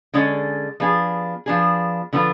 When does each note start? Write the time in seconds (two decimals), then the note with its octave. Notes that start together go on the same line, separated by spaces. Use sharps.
0.14 D3 G#3 C#4 G#4 D5
0.80 F3 B3 D4 G#4
1.46 F3 B3 D4 G#4
2.13 D3 F3 B3 F4